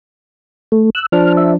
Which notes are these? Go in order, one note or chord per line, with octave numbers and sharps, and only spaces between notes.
A3
E6 F#6
F3 D4 F6
E5